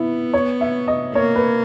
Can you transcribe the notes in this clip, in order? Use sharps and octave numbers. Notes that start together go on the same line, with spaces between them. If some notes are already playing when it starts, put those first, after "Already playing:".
Already playing: B3 E4
C#5
E5
D#5
A#3 C#5
B4